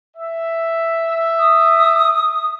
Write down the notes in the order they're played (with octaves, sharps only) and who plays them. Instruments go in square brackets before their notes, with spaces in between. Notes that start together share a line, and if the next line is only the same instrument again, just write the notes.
[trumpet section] E5
[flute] D#6